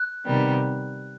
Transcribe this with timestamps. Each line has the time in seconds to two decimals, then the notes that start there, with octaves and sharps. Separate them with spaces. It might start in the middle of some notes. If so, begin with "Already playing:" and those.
Already playing: F#6
0.25 C3 D#3 G3 B3